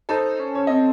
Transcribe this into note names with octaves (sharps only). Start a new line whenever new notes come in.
D#4 A4 C5
C#4
C#5
C4 D#5